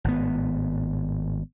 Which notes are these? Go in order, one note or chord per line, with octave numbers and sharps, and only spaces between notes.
G#1 A2 B3